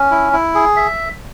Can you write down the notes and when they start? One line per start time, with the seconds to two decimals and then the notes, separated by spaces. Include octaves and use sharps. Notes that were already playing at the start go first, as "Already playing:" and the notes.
Already playing: C#4
0.11 E4
0.33 E4
0.55 G#4
0.76 E5